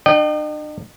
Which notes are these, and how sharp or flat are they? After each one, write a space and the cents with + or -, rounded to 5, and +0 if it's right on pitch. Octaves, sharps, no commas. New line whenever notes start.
D4 +40 D#5 -40 G5 -20